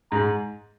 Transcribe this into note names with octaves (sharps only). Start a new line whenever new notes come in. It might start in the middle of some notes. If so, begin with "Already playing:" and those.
G#2 A#5